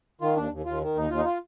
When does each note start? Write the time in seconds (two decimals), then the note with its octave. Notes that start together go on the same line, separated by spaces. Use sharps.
0.21 D#3 F4
0.36 D#2 D4
0.51 D#2
0.66 D#2 F4
0.81 D#3
0.95 D#2 D#4
1.10 D#2 F4
1.18 D#4
1.25 F4